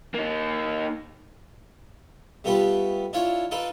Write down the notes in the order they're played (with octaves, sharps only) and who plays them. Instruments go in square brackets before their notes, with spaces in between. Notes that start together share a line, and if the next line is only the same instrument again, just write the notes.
[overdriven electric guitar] A#3 D#4
[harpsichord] G3 A3 B3 F4 G4 B4
D4 E4 F4 C#5 F5
D#4 F4 A4 B4 A5 D6